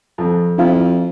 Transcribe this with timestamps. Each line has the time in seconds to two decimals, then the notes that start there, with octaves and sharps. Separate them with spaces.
0.18 F2
0.58 F2 E4 F4